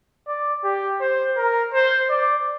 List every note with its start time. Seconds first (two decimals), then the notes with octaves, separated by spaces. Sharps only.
0.28 D5
0.64 G4
1.01 C5
1.37 A#4
1.74 C5
2.10 D5